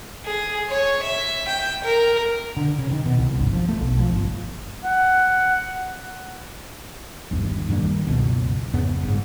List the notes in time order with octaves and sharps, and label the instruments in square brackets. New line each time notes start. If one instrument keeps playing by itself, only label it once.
[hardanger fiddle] G#4
C#5
E5
G5
A#4
[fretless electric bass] D3
C#3
D#3
B2
C2
G1
F3
A3
B1
F3
G1
[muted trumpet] F#5
[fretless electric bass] G1 D#2
G2 D#3 G3 A#3
F#1 C#2 B2
F2 G#2 C#3 B3
G1 G#2